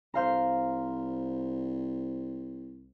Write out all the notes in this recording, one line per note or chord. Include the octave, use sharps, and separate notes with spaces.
C2 C5 F5 A#5